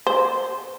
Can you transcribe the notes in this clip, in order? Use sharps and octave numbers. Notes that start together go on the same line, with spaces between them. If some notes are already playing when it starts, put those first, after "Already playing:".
C5